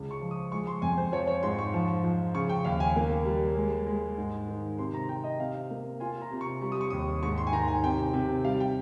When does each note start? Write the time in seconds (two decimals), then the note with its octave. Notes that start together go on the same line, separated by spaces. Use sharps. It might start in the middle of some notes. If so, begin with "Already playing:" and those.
Already playing: C#2
0.11 C#6
0.21 F3
0.31 D#6
0.52 G#3 C#6
0.67 C6
0.82 F2 G#5
0.98 C5
1.12 F3 C#5
1.27 C#5
1.43 G#2 C6
1.59 C#6
1.74 F3
2.04 F3
2.35 C#3 C#6
2.49 G5
2.65 D#2 F5
2.80 G#5
2.96 A#3
3.26 G3
3.56 G#3
3.87 G#3
4.18 G#2
4.48 D#3
4.79 C3 C6
4.94 A#5
5.09 C3 G5
5.24 D#5
5.39 C3 F5
5.71 A#3
6.00 F4 G#5
6.21 A#5
6.31 C3
6.41 C#6
6.61 G3
6.72 D#6
6.81 C#6
6.90 D#2 D#6
7.23 G#2 C#6
7.38 C6
7.47 G#5
7.53 D#3 A#5
7.68 G#5
7.84 C3 G5
8.14 C3
8.44 G3 F5
8.60 G5